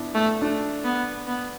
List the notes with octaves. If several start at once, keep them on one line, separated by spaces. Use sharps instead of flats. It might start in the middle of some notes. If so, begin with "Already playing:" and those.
Already playing: B3 D4 E4
A3
A3 D4
B3
B3